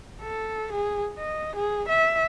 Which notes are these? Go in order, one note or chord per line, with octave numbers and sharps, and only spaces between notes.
A4
G#4
D#5
G#4
E5